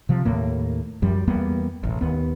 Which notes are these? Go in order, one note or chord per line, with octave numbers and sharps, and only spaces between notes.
C3 F3
D#2 A2 A#3
F#2 F3 G3
E2 G3 A#3 B3
E1 A1
D#2 B3